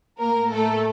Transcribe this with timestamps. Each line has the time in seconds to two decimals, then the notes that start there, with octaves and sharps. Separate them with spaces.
0.20 A2 A#3 A#4
0.53 A3 A4